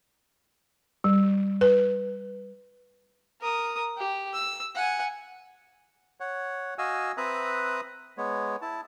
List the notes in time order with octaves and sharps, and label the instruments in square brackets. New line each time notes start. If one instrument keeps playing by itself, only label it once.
[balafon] G3
B4
[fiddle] A#4 D#6
G4
E6
F#5 G#5
[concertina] C#5 F#5
F#4 D#5 F5 G#5 E6
C4 B4 E5 A#5 D#6 F#6
G#3 B3 C#5
E4 A5